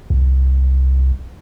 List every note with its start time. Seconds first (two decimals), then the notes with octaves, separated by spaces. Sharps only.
0.10 C2